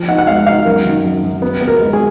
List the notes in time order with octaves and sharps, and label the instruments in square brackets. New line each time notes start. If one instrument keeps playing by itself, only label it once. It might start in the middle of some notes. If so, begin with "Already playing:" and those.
Already playing: [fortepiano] F3
D#4 F#5
F#5
G#3 F5
D#4 F5
F#2 A#4
D#3
F#2
F#2
B3
B3
A#4
G#3
G#4